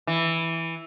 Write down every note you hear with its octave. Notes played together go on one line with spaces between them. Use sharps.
E3